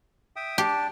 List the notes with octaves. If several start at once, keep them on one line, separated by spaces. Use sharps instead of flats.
E5 G5 D#6
D4 G4 G5 A5